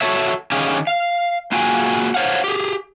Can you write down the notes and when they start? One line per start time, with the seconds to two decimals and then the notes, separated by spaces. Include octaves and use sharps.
0.01 F#4 G4 A4 C#5 E5
0.52 D3 D#3 C#4 G4 G#4 F5
0.87 F5
1.52 A#3 F4 F#4 G#4 G5 G#5
2.14 C5 C#5 F5 F#5
2.44 G4 G#4